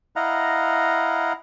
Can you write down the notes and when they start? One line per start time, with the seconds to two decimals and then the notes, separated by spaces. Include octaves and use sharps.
0.16 E4 D#5 F5 F#5 A#5